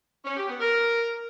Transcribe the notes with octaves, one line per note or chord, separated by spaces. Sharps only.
C#4
G4
B3
A#4